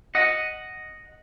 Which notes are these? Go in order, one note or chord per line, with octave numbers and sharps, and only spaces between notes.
D#5 F#5